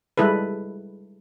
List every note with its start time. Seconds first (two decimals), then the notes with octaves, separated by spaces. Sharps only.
0.17 G3 G#3 E4 A4 B4